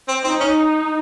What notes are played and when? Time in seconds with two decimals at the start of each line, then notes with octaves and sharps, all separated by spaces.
0.08 C4
0.24 C4 D#4
0.40 C#4